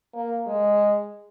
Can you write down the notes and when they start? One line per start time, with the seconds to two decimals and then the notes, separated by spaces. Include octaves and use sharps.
0.15 A#3
0.47 G#3